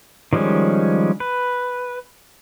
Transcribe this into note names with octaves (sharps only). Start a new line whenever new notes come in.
D#3 F3 G3 G#3 C#4
B4